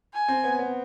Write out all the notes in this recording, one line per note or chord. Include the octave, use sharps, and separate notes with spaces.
G#5
C4
B3
B3